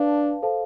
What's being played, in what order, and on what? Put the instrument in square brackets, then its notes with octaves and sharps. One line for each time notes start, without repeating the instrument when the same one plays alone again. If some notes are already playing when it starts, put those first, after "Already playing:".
Already playing: [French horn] D4 [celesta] B4 F5 A5
[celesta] A4 C5 F5 A5